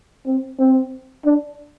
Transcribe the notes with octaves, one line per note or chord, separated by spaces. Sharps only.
C4
C4
D4